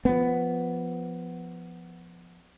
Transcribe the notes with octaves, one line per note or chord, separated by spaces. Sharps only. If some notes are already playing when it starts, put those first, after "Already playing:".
F3 B3